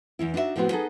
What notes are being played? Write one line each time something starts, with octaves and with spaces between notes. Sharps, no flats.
E2 E3 E4
D4 D#4 F#4 B4 E5
A2 F3 G3 B3 C4 F#4
B3 D#4 G#4 A4